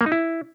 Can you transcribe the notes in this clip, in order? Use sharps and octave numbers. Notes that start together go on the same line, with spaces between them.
A#3
D#4
E4